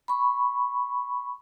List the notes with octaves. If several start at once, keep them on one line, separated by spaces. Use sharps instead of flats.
B5 C#6